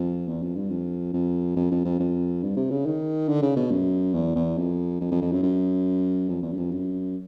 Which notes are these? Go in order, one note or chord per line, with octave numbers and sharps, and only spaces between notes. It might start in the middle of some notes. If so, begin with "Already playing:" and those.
Already playing: F2
E2
F2
G2
F2
F2
F2
F2
F2
F2
G2
C3
C#3
D#3
D3
C#3
B2
F#2
E2
E2
F2
F2
F2
F2
F#2
F#2
F2
E2
F#2
F2
F#2